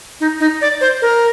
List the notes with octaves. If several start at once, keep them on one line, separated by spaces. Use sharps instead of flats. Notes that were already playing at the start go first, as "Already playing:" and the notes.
D#4
D#4
D5
C5
A#4